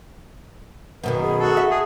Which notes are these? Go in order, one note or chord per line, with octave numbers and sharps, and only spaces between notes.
F#2 B2 D#3 B4
G#4
F#4 A4
E5
G#4